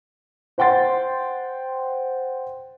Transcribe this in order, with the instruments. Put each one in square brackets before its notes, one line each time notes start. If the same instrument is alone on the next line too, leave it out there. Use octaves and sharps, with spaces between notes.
[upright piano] C5 F#5 G5 C6 A6